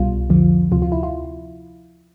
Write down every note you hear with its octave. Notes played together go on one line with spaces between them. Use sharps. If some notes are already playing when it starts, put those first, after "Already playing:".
Already playing: C2 B2 G3 F4
F2 D3 F3
D2 C3 F3 F4
F4
E4
F4